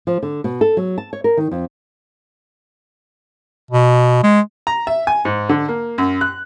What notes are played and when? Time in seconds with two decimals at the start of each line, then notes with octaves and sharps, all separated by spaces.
0.07 F3
0.23 D3
0.44 B2
0.61 A4
0.77 F#3
0.98 A5
1.13 C#5
1.24 A#4
1.37 D#3
1.51 F2
3.71 B2
4.23 G#3
4.67 A#5
4.87 E5
5.07 G#5
5.25 G#2
5.49 D3
5.68 A#3
5.98 F#2
6.21 F#6